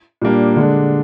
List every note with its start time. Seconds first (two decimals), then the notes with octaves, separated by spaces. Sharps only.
0.22 A#2 G3 A#3 D4 G4
0.56 D3 G#3 D4